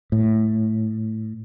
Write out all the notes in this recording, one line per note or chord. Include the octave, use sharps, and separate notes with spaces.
A2